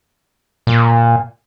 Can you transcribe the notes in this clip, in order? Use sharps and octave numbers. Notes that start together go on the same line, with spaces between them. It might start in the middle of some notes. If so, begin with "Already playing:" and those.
A#2